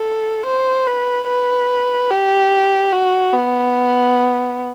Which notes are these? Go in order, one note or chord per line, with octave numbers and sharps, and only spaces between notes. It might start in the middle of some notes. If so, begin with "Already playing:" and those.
Already playing: A4
C5
B4
B4
G4
F#4
B3